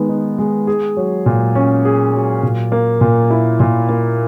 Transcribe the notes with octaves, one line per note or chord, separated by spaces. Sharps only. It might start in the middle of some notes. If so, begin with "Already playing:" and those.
Already playing: D#3 G#3 B3
D#4
G#3
G#4
F#3
A#2
C#4
G#4
F#3
A#2
A#3
A#2
E4
A#2
A#3